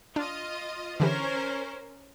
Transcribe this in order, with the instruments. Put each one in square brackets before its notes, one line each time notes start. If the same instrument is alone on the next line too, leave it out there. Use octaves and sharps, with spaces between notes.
[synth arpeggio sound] D4 [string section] F4 D#5
[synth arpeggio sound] D3 E3 G4 [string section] C#4 A#4 C5